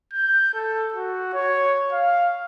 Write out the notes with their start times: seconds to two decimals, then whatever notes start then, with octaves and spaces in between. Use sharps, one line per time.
0.13 G6
0.54 A4
0.94 F#4
1.34 C#5
1.93 F5